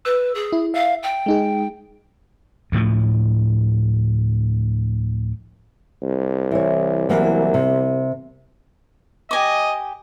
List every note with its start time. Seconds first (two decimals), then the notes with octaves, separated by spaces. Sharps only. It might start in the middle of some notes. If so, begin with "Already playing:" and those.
0.05 B4 E6
0.35 G#4
0.53 E4
0.74 E5 F5
1.03 G5
1.26 G#3 D#4 G#4
2.72 D2 A2 F3
6.02 C2
6.51 E3 C#5
7.09 E3 F#3 A#3
7.54 C3
9.31 G4 D#5 G#5 D6